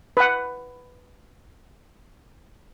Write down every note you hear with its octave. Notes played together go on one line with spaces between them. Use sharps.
B4 F#5